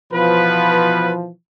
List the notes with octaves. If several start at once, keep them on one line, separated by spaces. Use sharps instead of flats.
B2 E3 F3 B3 F4 B4